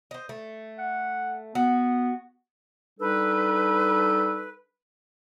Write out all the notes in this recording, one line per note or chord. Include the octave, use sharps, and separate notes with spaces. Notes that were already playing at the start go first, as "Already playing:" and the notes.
C5 D#5
A3
F#5
B3 F#4
G3 D4 D#4 A4 B4